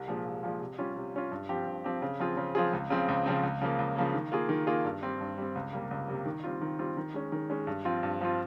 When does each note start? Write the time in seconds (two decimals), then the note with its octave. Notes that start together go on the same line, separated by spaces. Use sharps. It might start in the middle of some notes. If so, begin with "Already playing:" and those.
Already playing: C2
0.08 A#2 F3 G#3
0.25 C2
0.43 A#2 F3 G#3
0.60 C3
0.78 G3 C#4 F4
0.96 C3
1.14 G3 C#4 F4
1.31 G2
1.49 F3 C4 G4
1.67 G2
1.84 F3 C4 G4
2.02 C#3
2.20 F3 C4 F4 G#4
2.37 C#3
2.55 F3 C4 F4 G#4
2.73 C#2
2.90 C#3 F3 C4
3.08 C#2
3.26 C#3 F3 C4
3.43 C#2
3.61 C#3 F3 A#3
3.79 C#2
3.96 C#3 F3 A#3
4.14 D#3
4.32 A#3 F4 G#4
4.49 D#3
4.67 A#3 F4 G#4
4.85 G2
5.03 G3 C4
5.20 G2
5.38 G3 C4
5.55 C#2
5.73 C3 G3 A#3
5.91 C#2
6.08 C3 G3 A#3
6.26 D#3
6.44 G3 C4 F4
6.61 D#3
6.79 G3 C4 F4
6.97 D#3
7.14 G#3 C#4
7.32 D#3
7.50 G#3 C#4
7.67 G2
7.85 F3 C4 F4
8.03 G2
8.21 F3 C4 F4